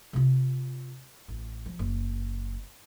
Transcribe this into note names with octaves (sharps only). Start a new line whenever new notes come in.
C3 F4
A1
F3
F#1